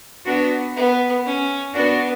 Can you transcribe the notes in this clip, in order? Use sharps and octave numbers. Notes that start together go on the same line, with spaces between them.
B3 D4 F#4
B3
C#4
B3 D4 F#4